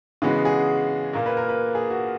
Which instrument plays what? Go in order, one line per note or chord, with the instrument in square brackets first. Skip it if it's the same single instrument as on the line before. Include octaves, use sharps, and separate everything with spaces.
[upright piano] C#3 E3 G#3 B3 F#4
G#4
A#2 A#3 A#4
B4
A#4
B4
G#4
F#4